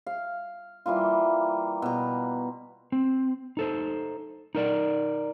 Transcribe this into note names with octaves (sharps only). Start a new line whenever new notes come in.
F5
E3 G3 A#3 F4
B2 A#5
C4
D#4 A4 C5
D#4 A#4 D5